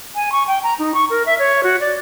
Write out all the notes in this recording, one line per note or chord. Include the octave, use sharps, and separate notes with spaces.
G#5
C#6
G5
A#5
D#4
C#6
A#4
E5
C#5
F#4
D5